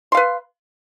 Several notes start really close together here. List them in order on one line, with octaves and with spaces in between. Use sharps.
C6 F5 B4